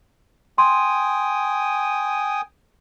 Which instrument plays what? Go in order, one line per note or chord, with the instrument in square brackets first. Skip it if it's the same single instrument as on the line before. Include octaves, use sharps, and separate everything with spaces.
[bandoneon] G5 G#5 D#6 [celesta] C6